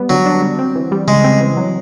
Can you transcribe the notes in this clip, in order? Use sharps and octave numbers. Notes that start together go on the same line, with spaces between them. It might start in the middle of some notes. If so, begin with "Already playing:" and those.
Already playing: G3 B3
D3 F#3
D4
G3
C4
E3
G3
C#3 G#3
C4
E3
F#3